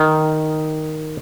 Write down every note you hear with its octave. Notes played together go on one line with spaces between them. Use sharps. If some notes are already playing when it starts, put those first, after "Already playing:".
Already playing: D#3